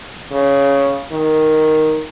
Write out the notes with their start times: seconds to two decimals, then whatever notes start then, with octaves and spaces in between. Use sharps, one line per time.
0.32 C#3
1.12 D#3